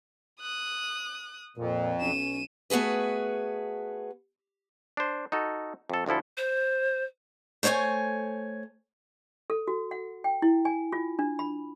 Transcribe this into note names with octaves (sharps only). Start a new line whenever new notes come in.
D#6 F#6
F2 A#2
B1 C#4 D#7 E7
A3 B3 F#4 G#4 B4
D4 C5
D#4 F#4 A4
F2 A4
D2 A2 F3 E4 A4
C5
A3 C5 C#5 F5 G#5
A4
F#4
F#5
G5
E4
G#5
F4
D4
B5